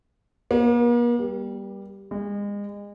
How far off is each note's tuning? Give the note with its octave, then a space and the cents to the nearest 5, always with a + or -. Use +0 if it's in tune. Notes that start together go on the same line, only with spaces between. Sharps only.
A#3 +45
G3 +5
G#3 -35